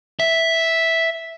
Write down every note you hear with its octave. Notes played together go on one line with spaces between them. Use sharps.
E5